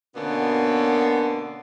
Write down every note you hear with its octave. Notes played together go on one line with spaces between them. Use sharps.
B2 D3 A#3 B3 C#4